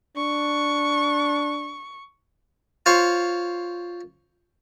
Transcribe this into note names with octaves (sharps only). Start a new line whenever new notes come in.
D4 C#6
F4 C5 C#5